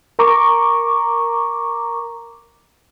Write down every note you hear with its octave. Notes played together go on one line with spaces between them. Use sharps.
A#4 A#5 C#6 D6